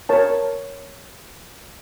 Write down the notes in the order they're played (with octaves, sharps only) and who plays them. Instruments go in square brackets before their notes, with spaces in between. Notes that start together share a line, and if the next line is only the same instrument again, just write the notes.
[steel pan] A#4 C#5 A5